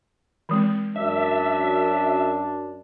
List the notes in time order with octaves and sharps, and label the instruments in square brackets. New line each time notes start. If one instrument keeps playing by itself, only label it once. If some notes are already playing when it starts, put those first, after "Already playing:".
[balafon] E3 G#3 C4
[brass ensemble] F#2 [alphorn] D4 [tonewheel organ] E5